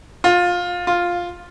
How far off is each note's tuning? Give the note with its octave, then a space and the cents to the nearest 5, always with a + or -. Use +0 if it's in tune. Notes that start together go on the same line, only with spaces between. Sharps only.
F4 +20
F4 +5